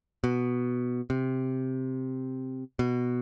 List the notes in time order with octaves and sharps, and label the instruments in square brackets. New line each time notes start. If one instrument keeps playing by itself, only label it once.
[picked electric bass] B2
C3
B2